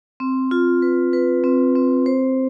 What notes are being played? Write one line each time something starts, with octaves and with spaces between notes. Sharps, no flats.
C4
F4
B4
B4
C4
C4
C5